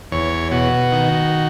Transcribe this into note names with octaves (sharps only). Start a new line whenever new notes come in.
E2 C#5
B2 F#4
D#3